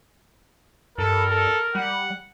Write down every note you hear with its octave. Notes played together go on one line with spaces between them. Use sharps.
G2 A4 A#4
A4
G3 F#5